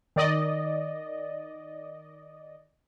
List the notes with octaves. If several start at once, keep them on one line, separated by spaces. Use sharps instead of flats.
D#3 D5 D#5